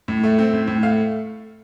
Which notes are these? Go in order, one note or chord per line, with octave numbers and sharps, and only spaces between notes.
A2
A3
C4
A2
A2
A3 F5